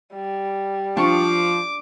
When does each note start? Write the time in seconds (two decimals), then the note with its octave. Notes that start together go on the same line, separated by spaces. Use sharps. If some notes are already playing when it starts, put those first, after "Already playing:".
0.14 G3
0.97 F3 D4 C#6 D6